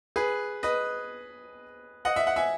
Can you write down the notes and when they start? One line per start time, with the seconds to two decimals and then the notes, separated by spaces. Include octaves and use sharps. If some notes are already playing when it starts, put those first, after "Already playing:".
0.16 G#4 B4
0.63 B4 D#5
2.05 D#5 F#5
2.16 E5
2.27 F#5
2.36 E5 G#5